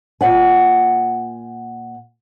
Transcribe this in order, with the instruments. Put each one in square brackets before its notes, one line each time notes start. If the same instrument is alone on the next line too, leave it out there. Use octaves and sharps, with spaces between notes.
[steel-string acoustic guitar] A#2 F#5 G#5